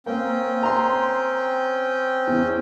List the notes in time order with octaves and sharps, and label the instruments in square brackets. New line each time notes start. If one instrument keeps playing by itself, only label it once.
[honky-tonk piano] A#3 [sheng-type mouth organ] C4 C#4 G5
[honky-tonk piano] A#5 C6
E2